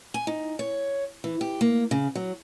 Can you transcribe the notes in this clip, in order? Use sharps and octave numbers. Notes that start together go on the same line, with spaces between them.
G#5
D#4
C#5
E3
G4
A#3
C#3
F#3